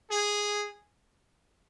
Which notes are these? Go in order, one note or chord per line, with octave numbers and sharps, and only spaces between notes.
G#4